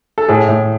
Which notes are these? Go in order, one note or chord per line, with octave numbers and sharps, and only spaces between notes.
A4
A2 G#4
A2